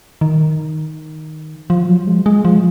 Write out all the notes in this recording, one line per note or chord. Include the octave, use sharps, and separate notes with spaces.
D#3
F3
F#3
G#3
G#3
F3